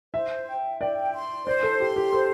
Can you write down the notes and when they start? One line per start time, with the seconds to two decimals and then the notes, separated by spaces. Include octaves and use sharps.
0.14 C5 E5
0.47 G5
0.80 D5 G5
1.13 C6
1.46 C5 D5
1.63 A4
1.80 G4 C6
1.96 G4
2.13 A4 C5